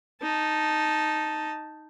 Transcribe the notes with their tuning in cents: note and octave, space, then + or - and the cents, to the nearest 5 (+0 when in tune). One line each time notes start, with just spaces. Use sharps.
D#4 +0 A5 +0